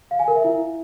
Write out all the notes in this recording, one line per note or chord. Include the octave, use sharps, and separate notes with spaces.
F5
G#5
A#4
E5
E4